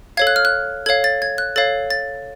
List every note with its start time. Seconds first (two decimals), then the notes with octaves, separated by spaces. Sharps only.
0.17 A4 C#5 F5 G#6
0.27 F#6
0.36 F6
0.45 F#6
0.86 A4 C#5 F5 G#6
1.04 A6
1.22 G#6
1.38 F#6
1.56 A4 C#5 F5 A6
1.90 A6